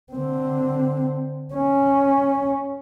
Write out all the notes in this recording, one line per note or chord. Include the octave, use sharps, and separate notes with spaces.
D3 C4
C#4